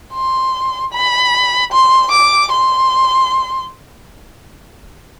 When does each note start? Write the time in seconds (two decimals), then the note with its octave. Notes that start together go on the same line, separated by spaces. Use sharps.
0.14 C6
0.93 B5
1.72 C6
2.11 D6
2.51 C6